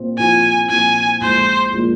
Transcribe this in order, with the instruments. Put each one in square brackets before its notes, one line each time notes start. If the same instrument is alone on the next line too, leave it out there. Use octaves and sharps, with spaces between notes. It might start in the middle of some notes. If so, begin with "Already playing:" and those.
Already playing: [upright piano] A#2 C4 F4
[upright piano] A#2 F3 C4 F4 [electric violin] G#5
[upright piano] A#2 F3 C4 F4 [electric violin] G#5
[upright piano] A#1 A#2 F3 G#3 [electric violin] C5
[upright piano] A#2 F3 G#3